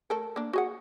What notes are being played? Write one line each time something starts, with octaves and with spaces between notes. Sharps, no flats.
A3 A4 A#4
A#3 D4
F#4 G#4 F#5